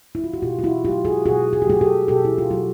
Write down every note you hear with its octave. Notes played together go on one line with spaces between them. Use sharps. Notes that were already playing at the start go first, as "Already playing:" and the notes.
E4
F4
F#4
B2 F4 G4
F4
E4 F#4
F#3 A3 F4 G4
F#4 G#4
B2 F#4 G#4
G#4
G4
F#3 A3 F#4 G#4
G4 A4
B2 G4 A4
E4
F4
F#3 A3 F#4